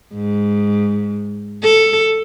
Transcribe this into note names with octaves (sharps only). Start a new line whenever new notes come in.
G#2
A4